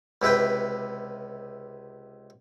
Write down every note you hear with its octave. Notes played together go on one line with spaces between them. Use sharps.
C#2 C3 E4 B4 G5